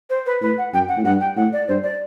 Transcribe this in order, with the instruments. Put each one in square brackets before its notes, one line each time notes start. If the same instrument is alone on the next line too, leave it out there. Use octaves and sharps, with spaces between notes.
[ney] C5
B4
[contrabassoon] A2 [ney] B4
[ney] F#5
[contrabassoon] F#2 [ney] G5
[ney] F#5
[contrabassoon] A2
[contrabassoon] G2 [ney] F#5
[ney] G5
[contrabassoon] A2 [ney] F#5
[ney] D5
[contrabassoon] G2 [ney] C5
[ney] D5